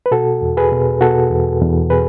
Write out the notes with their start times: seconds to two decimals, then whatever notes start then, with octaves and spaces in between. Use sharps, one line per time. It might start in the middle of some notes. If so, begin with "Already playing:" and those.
0.06 B4
0.11 B2 F#4 A4
0.42 E2
0.57 G#4 B4
0.72 B2
1.01 B2 F#4 A4
1.31 E2
1.62 E2
1.90 B2 G#4 B4